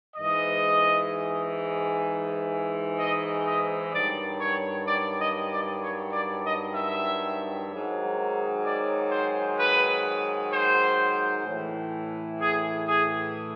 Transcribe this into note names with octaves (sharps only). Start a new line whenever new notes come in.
G#2 E3 D#5
D#5
D#5
G2 D#3 F#3 D5
C#5
D5
D#5
D5
C#5
D5
D#5
E5
G#2 D#3 F#3
D5
C5
B4
C5
A2 E3
G#4
G#4